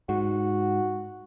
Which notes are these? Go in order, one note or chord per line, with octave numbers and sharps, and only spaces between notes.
G#2 F#4